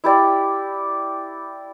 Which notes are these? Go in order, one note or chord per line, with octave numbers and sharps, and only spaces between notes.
E4 G4 D5